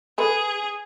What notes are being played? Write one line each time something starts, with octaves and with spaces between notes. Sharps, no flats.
G#4 A4 B4 B5